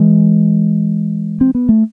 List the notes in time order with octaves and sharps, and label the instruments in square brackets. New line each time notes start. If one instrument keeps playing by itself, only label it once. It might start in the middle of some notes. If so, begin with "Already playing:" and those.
Already playing: [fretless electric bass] E3 G#3
C4
B3
A3